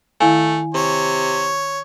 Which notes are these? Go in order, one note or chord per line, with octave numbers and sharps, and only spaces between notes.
D#3 A3 E4 F5 G#5
C3 C#5